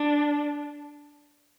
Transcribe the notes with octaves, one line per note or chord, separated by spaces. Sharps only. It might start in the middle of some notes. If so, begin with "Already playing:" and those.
Already playing: D4